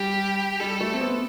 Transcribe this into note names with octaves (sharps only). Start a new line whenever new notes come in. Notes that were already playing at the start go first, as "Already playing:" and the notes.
Already playing: G3 G4
G3 A4
A3
C4
B3